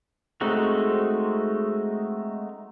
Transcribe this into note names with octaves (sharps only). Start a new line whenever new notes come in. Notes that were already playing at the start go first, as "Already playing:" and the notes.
G#3 A3 C4 D#4 F#4